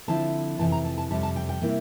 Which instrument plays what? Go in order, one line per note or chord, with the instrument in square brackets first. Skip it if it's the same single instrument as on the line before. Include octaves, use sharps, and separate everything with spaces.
[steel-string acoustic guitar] D3 F3 C4 E4 A5
F2 C3 E3 A5
A#5
A5
A5
F2 C3 G3 A5
A5
G5
G5
C3 G3 A#3 E4